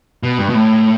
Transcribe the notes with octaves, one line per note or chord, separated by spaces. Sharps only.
B2
G2
B2
A2